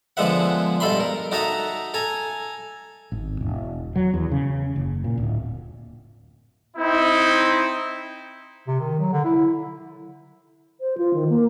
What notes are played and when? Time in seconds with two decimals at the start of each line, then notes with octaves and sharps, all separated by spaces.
0.17 D3 F3 G#3 B3 E5 F#5
0.80 G2 B2 A4 E5 B5 C6
1.00 A#4
1.32 D#4 F#4 A4 D#5 E5 A#5
1.94 A4 G#5 A#5
3.12 G#1
3.41 E1
3.96 F#3
4.14 E2
4.32 C#3
4.76 F#1
5.04 A#2
5.18 D1
6.77 C4 D#4 E4
8.67 C3
8.80 D#3
8.99 F#3
9.12 D3
9.24 E4
10.81 C5
10.98 F4
11.13 D#3
11.30 A#3